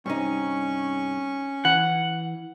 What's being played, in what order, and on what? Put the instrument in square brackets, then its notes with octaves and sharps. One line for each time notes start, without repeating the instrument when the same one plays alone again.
[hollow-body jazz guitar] G2 C3 D#4 [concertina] C#4 C#6
[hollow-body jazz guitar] E3 [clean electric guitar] F#5